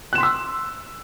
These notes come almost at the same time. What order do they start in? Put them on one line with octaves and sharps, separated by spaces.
F#6 E7 C6 B6 E6